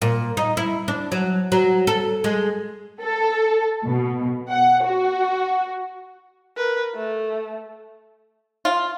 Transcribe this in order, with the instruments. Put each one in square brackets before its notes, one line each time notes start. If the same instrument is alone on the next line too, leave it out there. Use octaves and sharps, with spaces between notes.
[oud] A#2
D#4
E4
D4
F#3
F#3
A4
G#3
[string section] A4
B2
F#5
F#4
[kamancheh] A#4 B4
A3
[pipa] F4